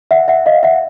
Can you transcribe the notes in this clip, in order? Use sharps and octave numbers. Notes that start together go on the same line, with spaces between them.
E5 F#5
E5 F#5
D#5 F5
E5 F#5